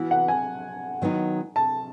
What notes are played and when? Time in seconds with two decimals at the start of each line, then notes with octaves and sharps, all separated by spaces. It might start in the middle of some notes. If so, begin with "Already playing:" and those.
Already playing: E3 B3 F#4 B4
0.11 F#5
0.28 G#5
1.02 D#3 F#3 B3 D#4
1.56 A5